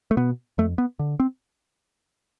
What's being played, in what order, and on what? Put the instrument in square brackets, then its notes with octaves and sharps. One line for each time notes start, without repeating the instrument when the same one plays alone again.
[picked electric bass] A3
B2 B3
F2 A3
B3
D3
C4